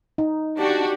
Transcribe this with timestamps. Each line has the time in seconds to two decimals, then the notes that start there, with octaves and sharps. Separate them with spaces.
0.18 D#4
0.59 D4 F#4 G4